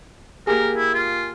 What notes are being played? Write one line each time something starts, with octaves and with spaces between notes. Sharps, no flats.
A#3 G4 G#4 A#4
E4
F4